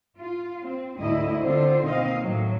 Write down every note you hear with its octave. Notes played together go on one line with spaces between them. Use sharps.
F4
C4
D2 G#2 E4 D#5
D3 C4 F4 C5
B2 D#3 A#3 C4 D#5 F5
A2 F#3